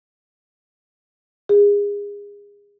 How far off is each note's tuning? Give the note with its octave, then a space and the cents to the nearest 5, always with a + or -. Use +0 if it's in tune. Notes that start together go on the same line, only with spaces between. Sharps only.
G#4 -30